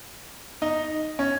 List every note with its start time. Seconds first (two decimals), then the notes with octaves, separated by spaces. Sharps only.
0.62 D#4
1.19 C#4